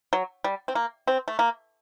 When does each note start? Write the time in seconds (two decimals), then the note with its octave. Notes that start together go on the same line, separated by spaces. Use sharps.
0.13 F#3
0.44 G3
0.68 C4
0.75 A#3
1.07 C4
1.28 A3
1.39 A#3